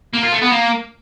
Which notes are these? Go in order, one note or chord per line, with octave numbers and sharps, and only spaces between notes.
A#3
F4
A3
B3
A#3